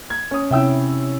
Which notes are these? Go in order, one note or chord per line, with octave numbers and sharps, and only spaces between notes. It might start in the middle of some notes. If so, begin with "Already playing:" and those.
G#6
C#4 D#6
C3 C#4 E4 E5 G5 E6